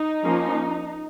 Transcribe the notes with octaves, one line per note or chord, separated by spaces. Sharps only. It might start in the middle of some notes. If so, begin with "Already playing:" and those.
Already playing: D#4
F3 A#3 C#4